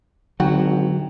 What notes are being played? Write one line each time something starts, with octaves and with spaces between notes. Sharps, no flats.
G#1 D3 F#3 F#4 G5